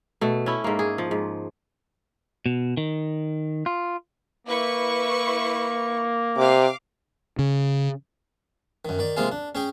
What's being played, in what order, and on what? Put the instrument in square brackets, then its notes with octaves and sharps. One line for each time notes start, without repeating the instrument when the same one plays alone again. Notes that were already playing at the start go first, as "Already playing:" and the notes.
[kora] B2 A3
C#4 E4
G#2 A#3
G#4
F3
G#2
[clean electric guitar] B2
D#3
F4
[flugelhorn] A#3 [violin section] E4 B4 C#6
[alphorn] C3 [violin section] F5 D6
[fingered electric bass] C#3
[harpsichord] F#2 D#3
D#3 D5
C3 G#3 A#3 F4 G#4
D4
C#4 G#4 G5